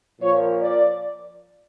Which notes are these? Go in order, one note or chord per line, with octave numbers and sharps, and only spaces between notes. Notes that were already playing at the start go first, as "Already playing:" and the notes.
A#2 F3 C#5
D5